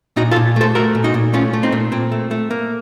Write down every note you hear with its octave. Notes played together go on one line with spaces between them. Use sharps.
A#2 D#4 F#4
F4 A4
A#2
A3 A4 C5
A3 F#4 A#4
A#2
D#4 F#4
A#2
A3 C#4 F4
A3
C4 D#4
A#2
A#2 C4
A3
A3
A#3